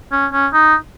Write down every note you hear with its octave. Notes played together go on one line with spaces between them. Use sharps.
C#4
C#4
D#4